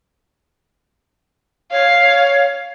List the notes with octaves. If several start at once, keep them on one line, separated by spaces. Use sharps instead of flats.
C#5 F5